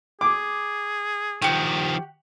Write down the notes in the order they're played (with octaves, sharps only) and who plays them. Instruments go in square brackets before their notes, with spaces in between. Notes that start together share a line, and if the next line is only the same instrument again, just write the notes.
[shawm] G#4 [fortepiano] D6
[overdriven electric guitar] D#3 F3 [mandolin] F#4 G4